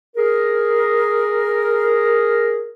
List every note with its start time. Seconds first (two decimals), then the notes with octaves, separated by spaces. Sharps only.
0.16 G#4 A#4